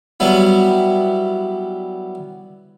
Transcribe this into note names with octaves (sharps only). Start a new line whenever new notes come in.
F#3 G3 B3 E4